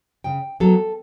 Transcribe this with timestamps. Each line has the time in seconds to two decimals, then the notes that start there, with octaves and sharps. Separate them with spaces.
0.24 C#3 G5
0.60 F#3 B3 A4